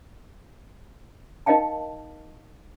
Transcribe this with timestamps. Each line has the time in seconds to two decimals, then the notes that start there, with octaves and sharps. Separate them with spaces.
1.46 D#4 A#4 D#5 F5 G5 A5